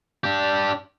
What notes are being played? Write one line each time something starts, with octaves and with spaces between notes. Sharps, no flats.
D4 G4